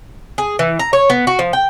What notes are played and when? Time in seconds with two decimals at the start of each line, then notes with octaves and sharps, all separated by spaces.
0.38 G#4
0.59 E3
0.79 A#5
0.93 C#5
1.10 B3
1.27 F#4
1.39 F3
1.53 G5